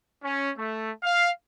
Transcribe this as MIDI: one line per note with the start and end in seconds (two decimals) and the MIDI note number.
0.23 0.51 61
0.57 0.90 57
1.03 1.29 77